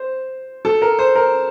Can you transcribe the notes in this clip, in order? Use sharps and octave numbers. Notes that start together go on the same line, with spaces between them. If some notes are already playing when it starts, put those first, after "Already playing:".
Already playing: C5
A4
A#4
C5
A#4